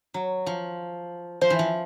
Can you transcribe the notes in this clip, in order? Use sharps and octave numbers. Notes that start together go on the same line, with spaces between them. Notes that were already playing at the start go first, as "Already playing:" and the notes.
F#3
F3
F3 C5
E3
F3